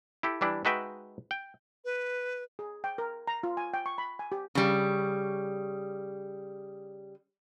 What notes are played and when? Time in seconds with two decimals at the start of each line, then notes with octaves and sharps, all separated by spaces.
0.23 E4 G4 A4
0.41 E3 G3 D4 E4
0.65 G#3 D#4 F#4 B4 E5 G5
1.31 G5
1.85 B4
2.59 G#4
2.84 G5
2.98 A#4
3.28 A#5
3.43 F4
3.57 G#5
3.74 G5
3.86 C#6
3.98 B5
4.19 G#5
4.32 G4
4.55 C#3 G3